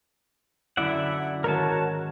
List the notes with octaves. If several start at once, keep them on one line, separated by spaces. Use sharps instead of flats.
F#2 D3 E4 D5 E5 F#5
G#2 D#3 F#4 A#4 C#5 A5